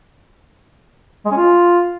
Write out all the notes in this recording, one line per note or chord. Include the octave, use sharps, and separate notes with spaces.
G#3
C#4
F4